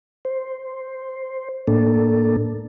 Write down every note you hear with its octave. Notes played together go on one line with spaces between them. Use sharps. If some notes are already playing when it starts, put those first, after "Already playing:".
C5
A2 A#3 D4 A4